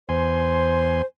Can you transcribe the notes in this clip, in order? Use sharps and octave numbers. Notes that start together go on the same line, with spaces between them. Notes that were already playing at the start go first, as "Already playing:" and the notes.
E2 C5 G#5 C6